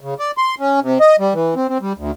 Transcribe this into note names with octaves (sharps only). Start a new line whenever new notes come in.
C#3
D5
C6
C#4
C3
D#5
G3
E3
C4
C4
G3
D2